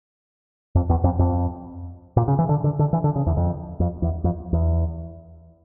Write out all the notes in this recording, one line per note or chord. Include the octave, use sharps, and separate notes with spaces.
F2
E2
F2
F2
A#2
C#3
E3
D3
D3
D3
E3
D3
C#3
E2
F2
F2
E2
F2
E2